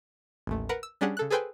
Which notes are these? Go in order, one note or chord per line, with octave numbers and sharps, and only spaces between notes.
A1 D#2 A3
A#4 B4 F#5
E6
G3 C#4 D4 G4 G#4 F#5
C#3 A4 F#6
G#4 A4 B4 C5 G5 G#5